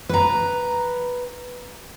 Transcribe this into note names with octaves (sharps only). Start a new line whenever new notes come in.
B4 A#5